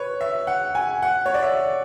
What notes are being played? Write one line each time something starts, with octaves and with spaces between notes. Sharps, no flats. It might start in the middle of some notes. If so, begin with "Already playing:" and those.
Already playing: B4 C#5
E5
F#5
G#5
F#5
C#5
D5
E5